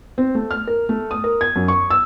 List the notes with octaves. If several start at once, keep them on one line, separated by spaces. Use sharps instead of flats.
C4
A3
F6
A#4
A3
D#6
A#4
G#6
F#2
C#6
E6